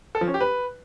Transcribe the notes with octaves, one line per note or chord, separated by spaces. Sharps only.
A4
F3
C#4
G4
B4